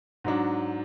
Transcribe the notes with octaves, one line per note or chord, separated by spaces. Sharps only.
G#2 F#3 D4